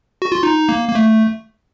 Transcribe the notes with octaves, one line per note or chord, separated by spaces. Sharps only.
F#4
F4
D#4
A#3
A#3
A3